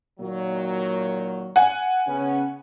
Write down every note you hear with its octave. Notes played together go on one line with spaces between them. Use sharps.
A#2 D#3 F#3
F#5 G#5
C#3 B3 C#4